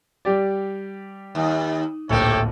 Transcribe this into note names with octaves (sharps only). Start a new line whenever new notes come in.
G3 G4 D5
D#2
D1 A#1 C3 A#3 A4 C#5 G5